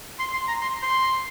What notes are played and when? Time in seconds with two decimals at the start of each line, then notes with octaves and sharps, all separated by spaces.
0.19 C6
0.33 C6
0.48 A#5
0.62 C6
0.82 C6